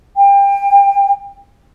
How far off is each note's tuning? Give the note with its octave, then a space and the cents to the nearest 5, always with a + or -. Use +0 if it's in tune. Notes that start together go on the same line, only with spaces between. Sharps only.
G5 +30